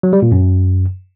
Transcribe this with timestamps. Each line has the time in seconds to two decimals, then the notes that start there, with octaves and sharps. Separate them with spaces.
0.03 F#3
0.13 G3
0.22 A#2
0.32 F#2